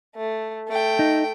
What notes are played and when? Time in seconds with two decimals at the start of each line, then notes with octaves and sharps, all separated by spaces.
0.16 A3
0.68 A3 G5
0.99 D#4